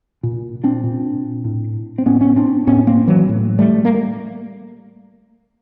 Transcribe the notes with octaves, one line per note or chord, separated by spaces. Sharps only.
A#2
C4 D4
A#2
A2
C4
A2 B3 C#4
B3 C#4
C4 D4
A2 B3 C#4
A#3 C4
E3 F#3
A2
G3 A3
A#3